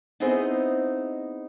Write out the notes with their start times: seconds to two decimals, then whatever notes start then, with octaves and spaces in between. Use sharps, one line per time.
0.20 B3 C4 D#4 E4 G#4 C5